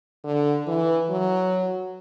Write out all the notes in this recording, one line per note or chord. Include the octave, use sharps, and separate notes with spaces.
D3
E3
F#3